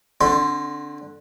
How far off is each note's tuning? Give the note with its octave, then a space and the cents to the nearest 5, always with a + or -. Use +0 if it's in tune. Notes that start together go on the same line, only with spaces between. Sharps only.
D3 +5 C4 +40 C6 -10